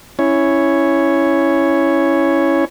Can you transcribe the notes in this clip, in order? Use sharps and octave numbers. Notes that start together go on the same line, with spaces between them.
C#4 E4 C#5